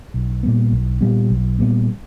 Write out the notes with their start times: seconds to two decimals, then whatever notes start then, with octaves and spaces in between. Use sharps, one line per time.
0.14 B1
0.43 A#2 G3 B3
0.72 B1
1.01 A#2 G3 B3
1.30 B1
1.59 A#2 G3 B3